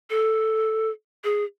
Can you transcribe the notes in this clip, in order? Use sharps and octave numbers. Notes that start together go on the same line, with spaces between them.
A4
G#4